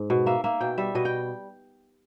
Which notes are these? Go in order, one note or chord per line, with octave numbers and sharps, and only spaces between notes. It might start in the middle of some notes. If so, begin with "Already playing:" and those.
Already playing: G#2
B2
A#3 E5
A#3 E5
B2 G5
G3 E5
B2 D#5
G5